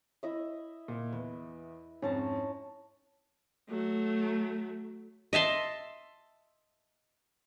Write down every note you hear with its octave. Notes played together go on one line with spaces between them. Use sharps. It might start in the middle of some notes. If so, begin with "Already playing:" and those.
E4 D#5 E5
A#2
E2 B4
F2 G#2 C#4 A5 A#5
F#3 A3
D#5 E5 A5 C6